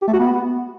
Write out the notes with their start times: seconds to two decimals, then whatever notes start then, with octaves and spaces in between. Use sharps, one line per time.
0.02 G4
0.08 A3
0.14 F#4
0.19 B3